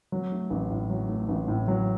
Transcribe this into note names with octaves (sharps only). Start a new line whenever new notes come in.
F#3
A3
A1
A2
F#3
A3
A1
A2
F#3